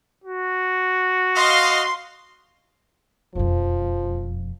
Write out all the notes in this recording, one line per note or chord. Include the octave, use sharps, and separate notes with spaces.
F#4
D#5 F5 C6
E1 F2 F3